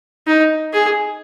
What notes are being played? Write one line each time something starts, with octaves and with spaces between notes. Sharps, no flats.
D#4
G#4